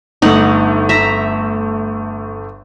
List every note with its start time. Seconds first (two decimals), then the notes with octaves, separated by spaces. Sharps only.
0.22 G1 A3 D#4 F#5
0.89 E5 A#5